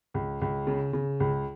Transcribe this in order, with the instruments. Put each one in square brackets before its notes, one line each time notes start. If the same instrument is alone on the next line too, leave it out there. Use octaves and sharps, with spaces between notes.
[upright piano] C#2
C#2
C#3
C#3
C#2